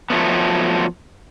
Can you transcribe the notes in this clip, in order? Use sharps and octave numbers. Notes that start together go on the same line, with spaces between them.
F3 F#3 A3 B3